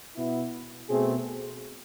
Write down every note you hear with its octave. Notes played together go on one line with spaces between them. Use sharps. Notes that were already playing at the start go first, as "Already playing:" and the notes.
B2 B3 E4
B2 A3 C4 G#4